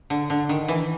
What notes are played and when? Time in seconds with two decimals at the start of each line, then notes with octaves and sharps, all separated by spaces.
0.10 D3
0.30 D3
0.49 D#3
0.68 E3